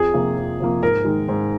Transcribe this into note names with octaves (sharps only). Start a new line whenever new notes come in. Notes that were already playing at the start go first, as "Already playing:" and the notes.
Already playing: F2 G#4
C3 F3 A#3
F2
C3 F3 A#3
G#2 A#4
D#3 G#3
G#2